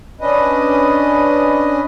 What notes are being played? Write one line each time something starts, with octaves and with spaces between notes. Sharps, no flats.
C#4 D4 B4 D#5